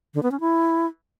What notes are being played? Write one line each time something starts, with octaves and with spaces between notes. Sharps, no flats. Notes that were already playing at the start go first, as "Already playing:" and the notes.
D3
B3
C#4
E4